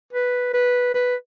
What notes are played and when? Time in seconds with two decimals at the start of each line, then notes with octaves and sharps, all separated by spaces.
0.13 B4
0.54 B4
0.94 B4